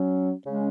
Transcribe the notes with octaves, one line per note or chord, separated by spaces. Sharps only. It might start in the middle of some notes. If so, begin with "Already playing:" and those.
Already playing: F#3 C#4
C#3 G#3 C#4